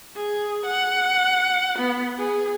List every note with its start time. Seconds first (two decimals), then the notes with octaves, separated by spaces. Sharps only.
0.16 G#4
0.66 F#5
1.78 B3
2.18 G#4